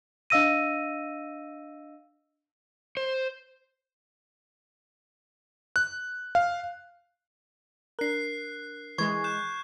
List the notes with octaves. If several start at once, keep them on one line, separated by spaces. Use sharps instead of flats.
D4 D#5 F5 E6 A#6 D#7
C5
F#6
F5
D4 A#4 F#6 C7
E3 G#3 C#6 G#6
F#6 G6 E7